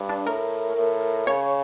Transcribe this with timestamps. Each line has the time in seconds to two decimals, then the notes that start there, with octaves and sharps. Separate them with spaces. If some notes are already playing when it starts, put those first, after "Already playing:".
Already playing: G2
0.09 D4
0.27 A2 A#4
0.76 A2
1.27 C#3 C#5